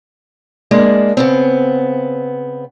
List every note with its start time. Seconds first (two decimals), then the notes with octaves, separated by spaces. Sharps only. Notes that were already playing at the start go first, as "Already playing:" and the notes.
0.71 G#3 A#3 D4
1.17 C#3 B3 C4